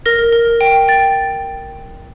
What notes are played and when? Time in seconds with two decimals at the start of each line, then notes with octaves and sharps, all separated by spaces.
0.06 A#4 A#6
0.33 A#4
0.61 G5
0.88 G5 A6